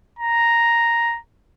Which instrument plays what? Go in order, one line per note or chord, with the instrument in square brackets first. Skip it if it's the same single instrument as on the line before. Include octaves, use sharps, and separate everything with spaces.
[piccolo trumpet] A#5